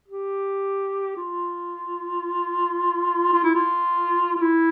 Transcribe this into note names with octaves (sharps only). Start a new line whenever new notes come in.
G4
F4
F4
E4
F4
F4
E4